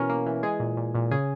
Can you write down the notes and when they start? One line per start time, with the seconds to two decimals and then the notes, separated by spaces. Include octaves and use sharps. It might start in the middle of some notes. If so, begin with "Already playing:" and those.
Already playing: B2 E3 C#4 A#4
0.09 A#3
0.26 E3
0.43 G#3 G#4
0.60 A#2
0.77 A#2
0.95 A#2
1.11 C#3 G#4